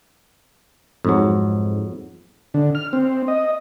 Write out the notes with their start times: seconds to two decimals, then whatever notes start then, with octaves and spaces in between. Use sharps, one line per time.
1.05 F2 G#2 F#3
2.54 D3
2.75 F6
2.93 C4
3.28 D#5